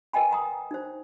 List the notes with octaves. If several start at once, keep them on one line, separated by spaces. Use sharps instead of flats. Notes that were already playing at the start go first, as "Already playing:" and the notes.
A#4 B4 D#5 G5 G#5 B5
F#5 A#5 D#6
D#4 C5